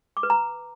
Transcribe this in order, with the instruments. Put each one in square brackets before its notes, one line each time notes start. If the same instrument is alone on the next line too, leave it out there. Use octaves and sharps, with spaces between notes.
[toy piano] D6
B4
A#5